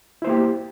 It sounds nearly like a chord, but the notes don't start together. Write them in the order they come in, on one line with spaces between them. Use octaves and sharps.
E4 C5 A#3 G4